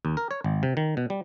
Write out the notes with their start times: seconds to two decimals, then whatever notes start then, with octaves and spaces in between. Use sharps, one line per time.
0.05 D#2
0.17 A#4
0.31 C#5
0.44 G#1
0.63 C3
0.77 D#3
0.97 B2
1.10 G3